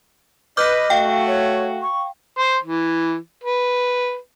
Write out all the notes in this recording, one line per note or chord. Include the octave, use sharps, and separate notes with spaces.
B4 D#5 D6 F6 G6
A3 F#4 F5 G5
C#5
C#6
C5
E3
B4